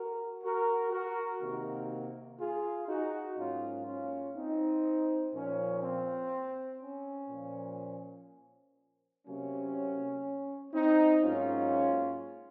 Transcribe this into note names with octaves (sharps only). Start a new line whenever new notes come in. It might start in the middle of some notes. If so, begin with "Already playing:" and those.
Already playing: F#4 A#4
F#4 A#4
F#4 A#4
C3 D#3 A#3 F#4 A#4
F4 G#4
D#4 F#4
G#2 F#3 A#3 C#4 F4
C#4 F4
C4 D#4
A#2 F3 A#3 C#4
C4
C#4
A#2 F3 A#3
C3 F#3 A#3 C#4
C4 D#4
G#2 F#3 A#3 C#4 F4